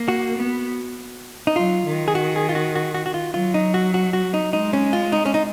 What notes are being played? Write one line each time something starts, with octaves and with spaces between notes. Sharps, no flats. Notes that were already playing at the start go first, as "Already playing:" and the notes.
Already playing: A#3
F#4
B3
D#4
F#3 F4
D#3
G#4
F#4
G#4
F4
F#4
F#4
F#4
F#4
F4
F#3 F4
D#4
F#4
F#4
F#4
D#4
G#3 D#4
C#4
F4
D#4
C#4
D#4